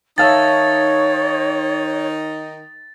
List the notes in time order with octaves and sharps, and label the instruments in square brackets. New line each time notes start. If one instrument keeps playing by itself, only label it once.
[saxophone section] D#3 D#4 [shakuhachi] C#5 [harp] E5 F5 A5 [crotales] A6